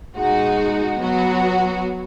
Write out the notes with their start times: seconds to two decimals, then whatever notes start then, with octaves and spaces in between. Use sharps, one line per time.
0.17 B2 G#3 D#4 F#4
0.99 F#3 B3 F#4